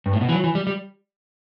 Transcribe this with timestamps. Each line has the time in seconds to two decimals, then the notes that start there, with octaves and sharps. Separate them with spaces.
0.06 G2
0.13 A2
0.21 B2
0.29 E3
0.32 F#3
0.44 E3
0.55 G3
0.67 G3